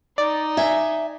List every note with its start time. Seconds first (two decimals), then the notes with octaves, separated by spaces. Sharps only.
0.18 D#4 D5
0.57 E5 G#5